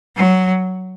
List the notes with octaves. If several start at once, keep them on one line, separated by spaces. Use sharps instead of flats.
F#3